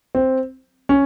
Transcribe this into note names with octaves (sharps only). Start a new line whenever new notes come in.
C4
C#4